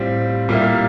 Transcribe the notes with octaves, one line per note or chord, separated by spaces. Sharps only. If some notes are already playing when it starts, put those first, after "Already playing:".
Already playing: A2 G3 C4 F4
A#2 G3 A#3 E4